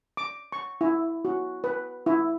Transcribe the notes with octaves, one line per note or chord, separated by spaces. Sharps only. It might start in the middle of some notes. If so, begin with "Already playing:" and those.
D6
C#6
E4
F#4
B4
E4